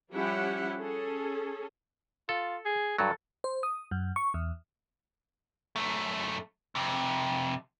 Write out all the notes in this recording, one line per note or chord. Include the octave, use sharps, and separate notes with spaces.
F3 G3 C#4 E4 G4 F#5
C#4 G#4 A4
F4 A4
G#4
G2 F#3 A4
C5
D#6
F#2
C#6
E2
F#2 A3
F2 C3